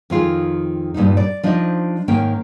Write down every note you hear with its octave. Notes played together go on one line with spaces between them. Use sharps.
F2 D#3 F4 G#4
G2 A#2 G#3 D#4
D5
F3 D4 D#4 C5 D#5
G#2 D#3 A#3 C#4 G5